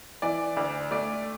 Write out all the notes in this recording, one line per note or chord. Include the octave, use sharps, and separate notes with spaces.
E3 D5
D2 D5
A3 D5